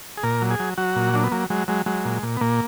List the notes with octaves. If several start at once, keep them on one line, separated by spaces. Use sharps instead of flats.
G#4
A#2 A#4
F#3
G#4
F#3
F#3 F#4
A#2
F#3 D4
B3
F#3 A#3
F#3 G#3
F#3 G#3
F#3 G#3
A#2
A#2
B3
A#2 A#3